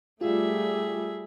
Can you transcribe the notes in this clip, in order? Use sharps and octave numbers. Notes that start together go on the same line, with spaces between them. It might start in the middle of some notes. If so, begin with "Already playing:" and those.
G3 A3 F4 G#4 E5